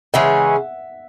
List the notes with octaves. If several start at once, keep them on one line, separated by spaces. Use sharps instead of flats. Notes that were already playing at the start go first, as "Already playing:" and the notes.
C#3 E3 G#3 C#4 E5 F#5